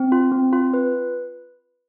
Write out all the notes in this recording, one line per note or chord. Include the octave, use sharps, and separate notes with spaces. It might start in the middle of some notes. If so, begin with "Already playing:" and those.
Already playing: C4
F4
C4
F4
B4